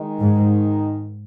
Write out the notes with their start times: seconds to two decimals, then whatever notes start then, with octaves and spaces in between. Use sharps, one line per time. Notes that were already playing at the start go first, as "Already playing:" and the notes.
Already playing: D#3 G#3 D#4
0.19 G#2